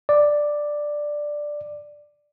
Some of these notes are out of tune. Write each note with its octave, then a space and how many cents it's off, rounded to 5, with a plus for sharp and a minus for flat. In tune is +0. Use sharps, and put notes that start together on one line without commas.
D5 +5